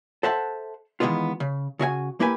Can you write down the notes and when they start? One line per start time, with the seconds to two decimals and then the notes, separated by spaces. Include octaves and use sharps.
0.23 A4 C5 E5 F#5 A5
1.00 D#3 E3 G3 G#3 B3 F4
1.40 C#3
1.79 C#3 F#4 E5 G#5
2.20 A#3 E4 G4 B4 G#5